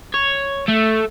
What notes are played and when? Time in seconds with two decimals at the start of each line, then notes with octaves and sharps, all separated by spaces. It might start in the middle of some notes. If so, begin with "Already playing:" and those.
0.14 C#5
0.69 A3